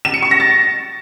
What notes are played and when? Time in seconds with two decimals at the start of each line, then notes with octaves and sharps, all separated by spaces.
0.05 E7
0.14 C#7
0.22 C#6
0.31 A#6
0.40 A6